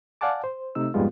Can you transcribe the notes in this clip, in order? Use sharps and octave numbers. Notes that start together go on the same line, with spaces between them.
D5 F5 F#5 G#5 A5 D6
C5
C3 A3 D#4 E6
F2 G#2 G3 G#3 B3 F4